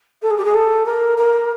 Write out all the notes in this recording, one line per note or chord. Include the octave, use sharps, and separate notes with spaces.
A4
G#4
G4
G#4
A4
A#4
A#4